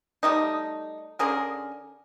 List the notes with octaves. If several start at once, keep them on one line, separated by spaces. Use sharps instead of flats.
G3 A3 D#4
D3 C#4 G#4 A#4